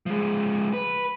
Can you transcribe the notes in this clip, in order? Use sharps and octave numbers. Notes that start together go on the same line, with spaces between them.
F3 G#3
B4